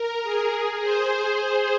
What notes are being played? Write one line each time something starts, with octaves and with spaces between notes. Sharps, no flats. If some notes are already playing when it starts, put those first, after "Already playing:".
Already playing: A#4
G#4
G#4
C5